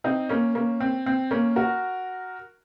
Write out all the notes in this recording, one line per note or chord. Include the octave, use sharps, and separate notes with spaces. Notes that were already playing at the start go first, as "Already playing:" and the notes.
C4 D#4
A#3 C#4
A#3 C#4
C4
C4
A#3 C#4
F#4 A#4